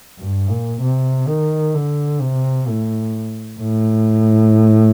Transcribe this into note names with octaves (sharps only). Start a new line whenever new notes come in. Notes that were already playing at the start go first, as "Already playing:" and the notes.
G2
A#2
C3
D#3
D3
C3
A2
A2